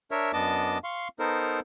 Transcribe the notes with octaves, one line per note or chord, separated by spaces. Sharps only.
D4 A#4 C#5 E5
F#2 B3 D4 D#5 A5 D6
F5 C6 C#6
B3 D#4 A4 A#4 C5